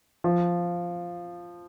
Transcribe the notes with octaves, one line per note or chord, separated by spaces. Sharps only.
F3